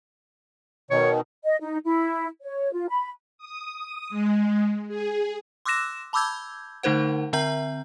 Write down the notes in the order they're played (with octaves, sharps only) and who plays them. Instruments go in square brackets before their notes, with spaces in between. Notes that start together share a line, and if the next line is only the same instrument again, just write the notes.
[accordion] B2 D#3 [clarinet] C#5
[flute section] D#5
D#4
E4
C#5
F4
B5
[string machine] D#6
G#3
G#4
[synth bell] C6 D6 E6 F#6 A#6 E7
A5 B5 D6 E6 G6 G#6
D3 A3 D#4 A#4 C5 F#5
D3 C4 E5 A#5 G6